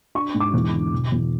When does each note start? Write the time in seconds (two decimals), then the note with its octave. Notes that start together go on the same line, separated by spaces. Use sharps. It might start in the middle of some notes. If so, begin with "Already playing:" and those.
0.15 D4 C#6
0.34 G#2
0.40 D6
0.54 E2
0.73 D3
0.92 E1
1.12 E2